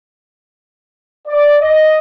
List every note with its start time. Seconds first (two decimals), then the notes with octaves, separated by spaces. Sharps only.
1.27 D5
1.60 D#5